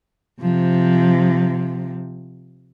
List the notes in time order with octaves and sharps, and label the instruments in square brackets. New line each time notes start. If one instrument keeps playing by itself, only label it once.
[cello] C3 F3